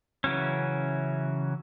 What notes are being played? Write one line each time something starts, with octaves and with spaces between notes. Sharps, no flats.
C#3 E3 F#3 C#4